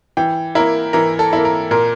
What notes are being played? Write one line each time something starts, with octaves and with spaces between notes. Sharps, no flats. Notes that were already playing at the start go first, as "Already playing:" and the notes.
E3 G5
A#3 E4 A#4
E3 A#4
A4
A#3 E4
A#4
A#2 A#4